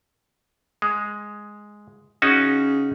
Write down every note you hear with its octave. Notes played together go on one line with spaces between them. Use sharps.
G#3
C#3 C#4 D#4 F#4